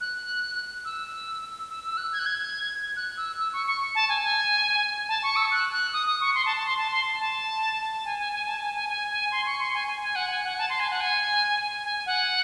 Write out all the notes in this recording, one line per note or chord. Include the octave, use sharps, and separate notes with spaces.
F#6
E6
E6
E6
F#6
G#6
F#6
G#6
F#6
E6
E6
C#6
C#6
A5
G#5
G#5
A5
C#6
E6
F#6
F#6
D#6
D#6
C#6
C6
A5
A5
C6
A5
C6
A5
G#5
G#5
G#5
A5
G#5
G#5
G#5
G#5
C6
C#6
C6
G#5
G#5
G#5
F#5
G#5
F#5
A5
C6
G#5
F#5
G#5
G#5
F#5